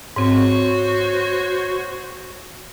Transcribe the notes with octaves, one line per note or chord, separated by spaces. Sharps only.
G#2 C4 F#4 C5 C#5